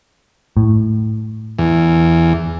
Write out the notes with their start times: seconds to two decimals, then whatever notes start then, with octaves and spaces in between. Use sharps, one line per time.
0.57 A2
1.59 E2